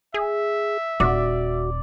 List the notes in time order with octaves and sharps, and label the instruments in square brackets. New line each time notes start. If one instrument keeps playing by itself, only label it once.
[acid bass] G#4 [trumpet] E5
[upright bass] D#1 [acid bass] F#4 [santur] D5